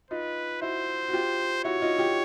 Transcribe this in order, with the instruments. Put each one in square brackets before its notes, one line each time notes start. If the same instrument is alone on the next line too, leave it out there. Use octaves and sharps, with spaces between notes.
[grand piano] D#4 F4 [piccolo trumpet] B4
[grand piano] E4 F#4 [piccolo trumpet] C5
[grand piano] F#4
F4 G4
[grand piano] E4 F#4 [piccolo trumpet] C#5
[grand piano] D#4 F4
F4 G4